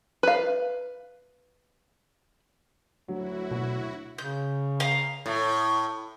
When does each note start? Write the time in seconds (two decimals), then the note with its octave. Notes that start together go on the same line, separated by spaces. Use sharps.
0.23 B4 F5
3.08 D2 F#3 E4 F#4
3.51 B2
4.18 C#3 G6
4.80 F5 A#5
5.26 A2